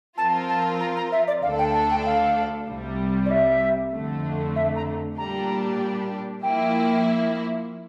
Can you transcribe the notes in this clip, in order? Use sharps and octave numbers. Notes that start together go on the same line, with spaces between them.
F3 C4 F4 A#4 A5
A5
A#5
A#5
E5
D5
D2 D3 A3 D4 A4 F5
G5
A5
G5
F5
C2 C3 G3
D5
E5
F2 D3 A3
E5
A#5
A#2 G3 D4 G4 A#5
F3 A#3 E4 G5